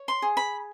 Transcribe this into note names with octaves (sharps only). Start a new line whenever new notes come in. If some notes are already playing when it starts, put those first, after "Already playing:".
Already playing: C#5
C6
G#4
B5